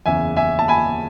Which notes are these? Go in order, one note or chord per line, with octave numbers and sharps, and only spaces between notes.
F#1 E2 C#3 E5 G#5
E5 G#5
A5
G#5 B5